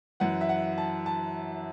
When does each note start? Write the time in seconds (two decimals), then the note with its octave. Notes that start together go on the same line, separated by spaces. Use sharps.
0.20 F#2 E3 F#5
0.41 E5
0.49 F#5
0.78 A5
1.06 A5